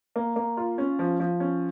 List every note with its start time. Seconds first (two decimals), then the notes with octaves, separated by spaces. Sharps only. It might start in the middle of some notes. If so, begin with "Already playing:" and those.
0.16 A#3
0.36 A#3
0.57 F4
0.78 C#4
0.99 F3
1.20 F3
1.40 C#4